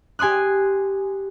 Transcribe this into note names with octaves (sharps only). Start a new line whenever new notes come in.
G4 G#5 C6 D#6 F#6